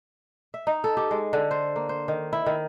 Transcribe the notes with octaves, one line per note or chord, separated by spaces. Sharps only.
E5
D#4
A4
G4
G#3
D3
C5
A#3
C5
D#3
E4
D#3